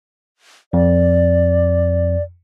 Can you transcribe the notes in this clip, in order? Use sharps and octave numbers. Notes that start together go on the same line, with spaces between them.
F2 D5